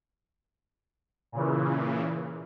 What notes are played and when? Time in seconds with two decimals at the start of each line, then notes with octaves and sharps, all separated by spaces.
1.32 A#2 C#3 E3